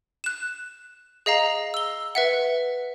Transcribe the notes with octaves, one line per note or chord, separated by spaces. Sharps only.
F#6 E7
G#4 D#5 F5 A#5
E6 G7
B4 E5 F#5